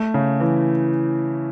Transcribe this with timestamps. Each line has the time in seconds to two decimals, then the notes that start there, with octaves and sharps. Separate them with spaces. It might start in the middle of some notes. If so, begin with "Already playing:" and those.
Already playing: A3
0.14 C#3
0.40 E3